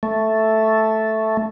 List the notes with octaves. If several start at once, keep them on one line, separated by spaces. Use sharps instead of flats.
A3